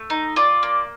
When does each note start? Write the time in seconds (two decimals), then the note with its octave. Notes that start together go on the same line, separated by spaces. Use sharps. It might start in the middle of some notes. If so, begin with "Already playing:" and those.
Already playing: A3
0.10 D#4
0.36 F4 D5
0.63 A#3